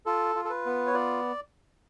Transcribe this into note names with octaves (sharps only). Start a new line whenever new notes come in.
F4 A4
F4
A4
B4
B3
C#5
F4 D5